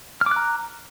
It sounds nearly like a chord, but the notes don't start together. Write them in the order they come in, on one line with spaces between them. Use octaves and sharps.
F6 D6 F#6 A#5